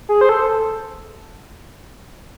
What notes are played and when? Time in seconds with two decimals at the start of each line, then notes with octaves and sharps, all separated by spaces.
0.09 G#4
0.21 C5
0.29 A4